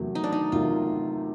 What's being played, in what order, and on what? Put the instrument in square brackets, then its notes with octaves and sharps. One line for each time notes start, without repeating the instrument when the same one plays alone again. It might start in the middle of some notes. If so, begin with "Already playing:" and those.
Already playing: [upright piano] E2 C3 D#3 F#3 A3
[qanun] D#4
D4
D#4
[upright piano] E2 C3 D#3 F#3 A3 [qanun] F4